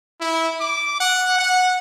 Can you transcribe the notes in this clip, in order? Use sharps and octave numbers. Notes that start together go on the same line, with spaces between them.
E4
D6
F#5
F#5